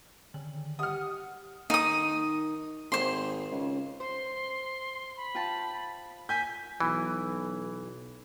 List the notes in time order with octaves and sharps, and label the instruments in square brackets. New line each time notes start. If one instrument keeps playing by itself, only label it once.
[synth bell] D3 D#3 F#7
[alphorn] G4 [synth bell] D#5 [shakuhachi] F#5 [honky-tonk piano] D#6 F6
[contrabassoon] D#3 [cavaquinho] D#4 D#6
[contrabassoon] G#1 [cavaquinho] C5 C6
[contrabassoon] C#2
[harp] C5 [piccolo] C6
[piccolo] B5
[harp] F4 G5 A5
[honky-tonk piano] G#5 G6 [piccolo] B6
[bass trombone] B1 [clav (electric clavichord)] E3